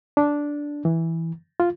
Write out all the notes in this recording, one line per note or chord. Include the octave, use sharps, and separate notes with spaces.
D4
E3
F4